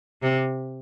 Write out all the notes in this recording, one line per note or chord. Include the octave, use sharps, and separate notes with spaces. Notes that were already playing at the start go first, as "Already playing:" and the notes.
C3